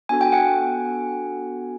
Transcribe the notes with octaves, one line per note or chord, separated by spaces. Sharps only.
B3 D4 F#4 A4 G#5
G5
F#5 G#5